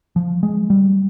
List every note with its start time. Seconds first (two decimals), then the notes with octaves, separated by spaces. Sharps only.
0.16 F3
0.43 G#3
0.70 G3